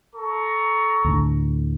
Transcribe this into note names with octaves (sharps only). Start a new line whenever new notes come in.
A4 A#5 C#6
D2 A2 D3